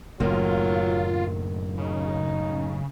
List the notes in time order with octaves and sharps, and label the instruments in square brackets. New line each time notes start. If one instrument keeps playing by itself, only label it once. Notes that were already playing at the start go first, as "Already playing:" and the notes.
[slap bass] F#1 F#2 A2 [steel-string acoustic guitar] D#3 A#3 [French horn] F#3 [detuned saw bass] F4
[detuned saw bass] C#3 [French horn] D#4